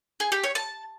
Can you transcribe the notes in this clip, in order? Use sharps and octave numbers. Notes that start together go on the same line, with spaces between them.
G#4
G4
C#5
A5